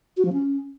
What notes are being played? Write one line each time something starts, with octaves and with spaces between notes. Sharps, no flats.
F#4
F3
C#4